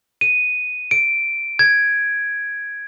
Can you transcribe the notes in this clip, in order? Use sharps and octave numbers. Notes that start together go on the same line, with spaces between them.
D#7
D7
G#6